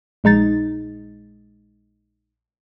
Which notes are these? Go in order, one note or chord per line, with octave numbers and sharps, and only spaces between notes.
A#1 G#3 D#4 A6